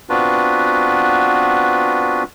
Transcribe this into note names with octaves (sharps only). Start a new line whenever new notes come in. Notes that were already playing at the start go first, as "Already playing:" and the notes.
B3 C4 D4 F4 F#4 B4